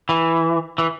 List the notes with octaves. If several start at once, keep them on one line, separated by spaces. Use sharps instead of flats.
E3
E3